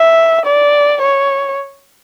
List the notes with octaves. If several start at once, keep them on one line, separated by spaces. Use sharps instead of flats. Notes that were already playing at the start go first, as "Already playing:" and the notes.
Already playing: E5
D5
C#5